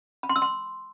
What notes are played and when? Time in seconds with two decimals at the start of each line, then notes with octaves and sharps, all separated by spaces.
0.23 B5
0.29 C6
0.36 E6
0.42 C6